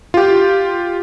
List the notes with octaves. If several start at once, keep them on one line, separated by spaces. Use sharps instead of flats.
F4 G4